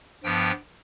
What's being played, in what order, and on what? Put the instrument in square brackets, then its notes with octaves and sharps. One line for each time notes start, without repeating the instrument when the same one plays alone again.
[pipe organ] G2 F3 B3 G5